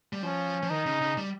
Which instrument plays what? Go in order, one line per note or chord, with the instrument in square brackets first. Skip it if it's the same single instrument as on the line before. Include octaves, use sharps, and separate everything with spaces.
[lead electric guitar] G3
[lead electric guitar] F3 [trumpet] C#4
[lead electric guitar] F3
[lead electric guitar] D#3 [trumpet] D#4
[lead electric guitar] C#3
C#3
G3